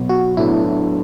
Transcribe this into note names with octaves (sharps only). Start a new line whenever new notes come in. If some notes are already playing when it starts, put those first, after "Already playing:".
Already playing: B2 F#3 B3
F#4
A2 F#3 B3 D4 E4 A4